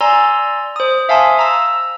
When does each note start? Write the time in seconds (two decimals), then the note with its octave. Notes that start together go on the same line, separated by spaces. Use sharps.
0.01 D5 G#5 A#5 C6 E6
0.76 C5 D#6
1.09 E5 F5 G#5 A5 C6 D#6
1.39 A#5 E6